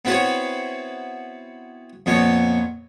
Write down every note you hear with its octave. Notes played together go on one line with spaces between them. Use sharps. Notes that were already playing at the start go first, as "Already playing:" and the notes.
B3 C4 E4 F#4 B4 C#5
F2 A#2 B3 C#5